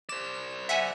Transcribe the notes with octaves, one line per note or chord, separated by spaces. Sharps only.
C5 D5 E7
E5 F#5 G#5